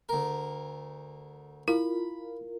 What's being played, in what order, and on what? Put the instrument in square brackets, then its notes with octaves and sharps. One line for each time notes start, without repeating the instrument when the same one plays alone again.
[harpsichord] D2 A#4
[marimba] E4 [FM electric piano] F4 A#4 [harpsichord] B5